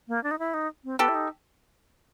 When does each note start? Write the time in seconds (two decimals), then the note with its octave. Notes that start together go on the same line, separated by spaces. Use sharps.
0.08 A#3
0.23 D4
0.31 D#4
0.39 E4
0.54 D#4
0.84 C4
0.99 B3 G4 A4
1.09 E4
1.15 D#4